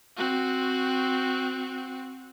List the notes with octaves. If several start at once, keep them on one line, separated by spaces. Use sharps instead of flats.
C4 F#4